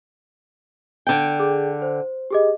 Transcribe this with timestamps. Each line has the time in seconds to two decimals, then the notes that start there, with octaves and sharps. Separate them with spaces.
1.07 D3 G5
1.40 G#4
1.82 C5
2.31 G4 G#4 D#5